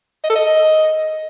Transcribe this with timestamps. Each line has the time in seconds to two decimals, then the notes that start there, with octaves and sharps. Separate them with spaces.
0.24 D#5
0.30 A4
0.35 D#5